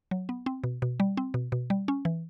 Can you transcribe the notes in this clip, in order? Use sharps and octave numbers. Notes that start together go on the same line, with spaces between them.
F#3
B3
C4
B2
B2
G3
C4
B2
B2
G3
C#4
E3